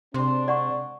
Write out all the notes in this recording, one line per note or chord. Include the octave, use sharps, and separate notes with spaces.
C3 G#3 C4 D4 C5 C6
D5 F#5 C#6